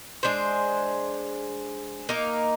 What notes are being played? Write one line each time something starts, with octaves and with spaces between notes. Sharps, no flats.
G#3 D4 G#4 C5
A#3 D#4 A#4